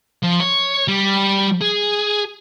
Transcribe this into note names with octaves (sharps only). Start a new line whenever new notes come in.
F3
C#5
G3
G#4